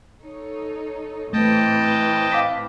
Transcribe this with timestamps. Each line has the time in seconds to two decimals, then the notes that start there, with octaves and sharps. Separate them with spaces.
0.22 D#4 A4 C#5
1.33 A2 E3 A3 C4 D#5 G5 A5
2.32 F5 D6 B6